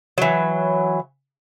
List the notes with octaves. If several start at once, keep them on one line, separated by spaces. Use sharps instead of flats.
E3 F#3